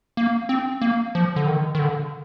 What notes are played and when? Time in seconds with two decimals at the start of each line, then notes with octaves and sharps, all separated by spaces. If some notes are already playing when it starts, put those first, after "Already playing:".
0.17 A#3
0.49 C4
0.82 A#3
1.15 F3
1.36 D3
1.47 D#3
1.75 D#3
1.79 D3